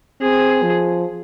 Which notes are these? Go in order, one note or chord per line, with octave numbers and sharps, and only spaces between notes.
C4 G#4
F3